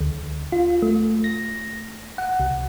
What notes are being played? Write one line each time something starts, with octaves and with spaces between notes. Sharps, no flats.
D2
F4
A3
A#6
F#5
C2